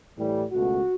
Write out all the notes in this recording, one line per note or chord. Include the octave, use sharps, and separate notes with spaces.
A2 E3 G3
C#2 B2 A3 F#4